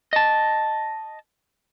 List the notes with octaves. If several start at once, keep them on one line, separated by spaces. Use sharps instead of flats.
D#5 A5